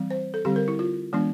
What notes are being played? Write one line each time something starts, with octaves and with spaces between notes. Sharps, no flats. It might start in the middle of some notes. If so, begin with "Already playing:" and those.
Already playing: E3 G3 C4
C5
A4
D3 G3 C4 G4
A#4
E4
F4
E3 G#3 B3 D4